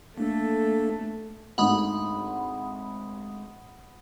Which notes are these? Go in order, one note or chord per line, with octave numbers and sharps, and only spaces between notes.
A3 A#3 D4 A4
G#1 D2 D#4 F#5 B5 D#6